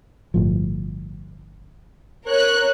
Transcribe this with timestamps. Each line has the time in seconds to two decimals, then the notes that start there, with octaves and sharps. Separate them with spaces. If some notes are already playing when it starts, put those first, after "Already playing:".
0.34 G1 A2 F3
2.27 A#4 C#5 F#6